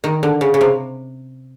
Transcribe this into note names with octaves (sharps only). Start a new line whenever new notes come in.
D#3
D3
C#3
C#3
C3